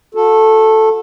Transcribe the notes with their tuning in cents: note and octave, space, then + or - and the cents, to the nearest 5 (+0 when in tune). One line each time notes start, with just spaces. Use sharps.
F#4 -35 A4 +0